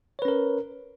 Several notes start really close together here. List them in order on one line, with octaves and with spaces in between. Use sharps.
C#5 B4 C#4 A#4